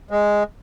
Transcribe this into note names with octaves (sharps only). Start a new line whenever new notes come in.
G#3